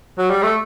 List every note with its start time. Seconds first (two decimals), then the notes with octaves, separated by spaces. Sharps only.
0.18 F#3
0.30 G3
0.43 A3